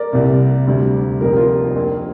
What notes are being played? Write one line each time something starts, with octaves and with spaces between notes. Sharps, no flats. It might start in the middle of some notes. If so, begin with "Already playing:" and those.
Already playing: A#4 D5
C2 C3 A#3
D2 C3 G3
F1 F2 F3 A#3 A#4
G4
F4 A#4
A#1 A#2 A#3